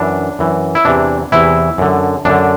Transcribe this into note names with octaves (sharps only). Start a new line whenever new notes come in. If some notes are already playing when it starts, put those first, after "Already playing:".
Already playing: F#2 E3 D4
F#2 E3
E4
E2 C3 E3 D4
E2 C3 E3 E4
F#2 D3
F#2 D3 D4